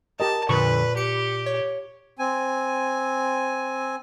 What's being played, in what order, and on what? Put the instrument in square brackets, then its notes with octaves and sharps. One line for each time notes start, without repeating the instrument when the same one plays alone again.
[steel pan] G4 A#4 D#5 [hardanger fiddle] A5
[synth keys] F2 D3 [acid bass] A#2 [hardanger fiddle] B4 [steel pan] C#6
[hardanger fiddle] G4 [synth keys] C#7
[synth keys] C#5
[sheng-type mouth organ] C4 G#5